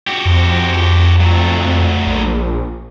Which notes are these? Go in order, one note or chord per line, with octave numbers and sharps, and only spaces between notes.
F#4 G4
F2
F#3 A3
A#1